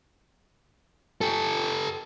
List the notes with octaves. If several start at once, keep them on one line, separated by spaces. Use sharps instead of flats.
G4 A4